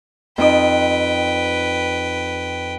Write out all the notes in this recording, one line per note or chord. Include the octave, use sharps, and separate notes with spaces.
F2 D#4 B4 G5 D#6